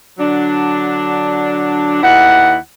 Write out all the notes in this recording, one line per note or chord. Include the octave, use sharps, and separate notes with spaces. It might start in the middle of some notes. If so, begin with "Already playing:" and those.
D3 F#3 D4
D#2 E4 F#5